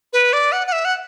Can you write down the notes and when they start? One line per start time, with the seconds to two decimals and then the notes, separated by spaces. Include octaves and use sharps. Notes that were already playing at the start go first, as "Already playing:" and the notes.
0.13 B4
0.33 D5
0.52 F#5
0.67 F#5
0.72 E5
0.85 F#5